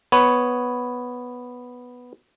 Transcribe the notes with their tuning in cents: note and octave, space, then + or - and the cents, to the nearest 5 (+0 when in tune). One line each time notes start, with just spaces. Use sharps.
B3 +0 C#5 +0